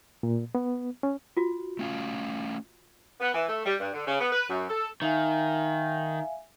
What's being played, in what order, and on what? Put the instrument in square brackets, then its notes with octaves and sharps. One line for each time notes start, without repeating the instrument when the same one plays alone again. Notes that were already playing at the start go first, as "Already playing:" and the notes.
[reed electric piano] A#2
B3
C#4
[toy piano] F4 F#4
[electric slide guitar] A3 C#4 F5
[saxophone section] B3
E3
A3
G3
G2
D3
C#3
B3
B4
F#2
A4
[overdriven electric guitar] D#3 [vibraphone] E5 F5 G#5